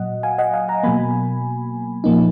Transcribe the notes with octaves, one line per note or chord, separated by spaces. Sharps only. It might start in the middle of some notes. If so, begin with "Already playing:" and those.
Already playing: A#2 F#3 D#5 F#5
F5 G#5
D#5 F#5
F5 G#5
F#5 A#5
B2 F#3 A#3 G#5 B5
A#2 F3 A#3 D#4